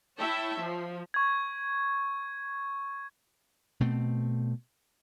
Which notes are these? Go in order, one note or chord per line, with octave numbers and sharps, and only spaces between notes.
E4 C#5 E5 G5 A5
F3
C#6 G#6
B2 A3 C4